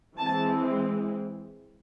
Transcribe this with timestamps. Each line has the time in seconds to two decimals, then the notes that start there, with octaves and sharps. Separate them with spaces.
0.18 E3 G#3 C4 A5